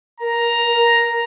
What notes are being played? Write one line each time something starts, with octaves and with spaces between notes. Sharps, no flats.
A#4 A#5